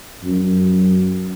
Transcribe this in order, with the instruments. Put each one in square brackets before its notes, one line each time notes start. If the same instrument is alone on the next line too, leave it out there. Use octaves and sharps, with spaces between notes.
[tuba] F#2